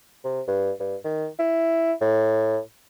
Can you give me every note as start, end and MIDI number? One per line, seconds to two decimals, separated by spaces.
0.24 0.41 48
0.48 0.71 43
0.80 0.96 43
1.05 1.27 51
1.39 1.93 64
2.01 2.59 45